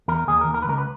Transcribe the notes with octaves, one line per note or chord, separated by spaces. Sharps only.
E2 A#4
D#2 G#4
A#4
D#2
A#4
B4
C#2 A#4
B4